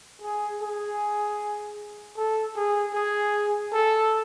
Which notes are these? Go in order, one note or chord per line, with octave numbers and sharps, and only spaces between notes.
G#4
G#4
A4
G#4
G#4
A4